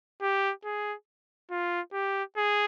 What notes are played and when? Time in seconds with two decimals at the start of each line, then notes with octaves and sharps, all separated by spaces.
0.22 G4
0.65 G#4
1.51 F4
1.93 G4
2.36 G#4